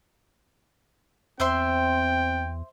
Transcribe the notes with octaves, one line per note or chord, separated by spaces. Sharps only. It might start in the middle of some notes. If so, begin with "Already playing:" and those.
E2 C4 C5 E5 G5 C6